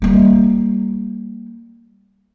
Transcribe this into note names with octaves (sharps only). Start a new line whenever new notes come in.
G3 A#3